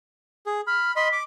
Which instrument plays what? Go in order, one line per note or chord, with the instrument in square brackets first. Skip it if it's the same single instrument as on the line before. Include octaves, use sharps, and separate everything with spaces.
[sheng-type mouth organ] G#4
[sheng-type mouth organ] B5 [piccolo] F6
[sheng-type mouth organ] D#5 B5 C6 [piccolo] B6
[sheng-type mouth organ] D6